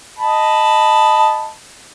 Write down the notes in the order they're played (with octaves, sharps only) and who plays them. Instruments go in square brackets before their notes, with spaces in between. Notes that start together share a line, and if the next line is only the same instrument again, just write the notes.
[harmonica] D#5 A5 B5